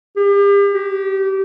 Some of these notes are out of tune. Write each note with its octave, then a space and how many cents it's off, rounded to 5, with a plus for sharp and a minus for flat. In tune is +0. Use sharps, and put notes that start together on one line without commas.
G4 +40
G4 -25